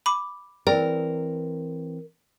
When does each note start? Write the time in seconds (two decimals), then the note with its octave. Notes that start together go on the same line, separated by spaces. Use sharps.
0.06 B5 D6
0.67 E3 C4 A#4 D5 G5